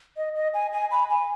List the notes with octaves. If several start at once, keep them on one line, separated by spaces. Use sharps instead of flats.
D#5
D#5
G#5
G#5
B5
G#5